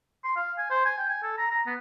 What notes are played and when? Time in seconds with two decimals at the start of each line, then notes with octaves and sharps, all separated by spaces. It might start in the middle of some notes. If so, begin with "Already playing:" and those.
0.24 C6
0.36 F5
0.58 G#5
0.70 C5
0.86 G#5
0.98 G5
1.09 G#5
1.23 A4
1.38 A#5
1.51 A#5
1.67 B3